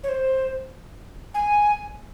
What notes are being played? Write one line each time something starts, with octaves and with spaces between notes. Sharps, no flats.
C#5
C5
G#5